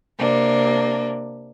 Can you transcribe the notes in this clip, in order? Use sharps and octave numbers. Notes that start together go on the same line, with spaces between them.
C3 A#3 D4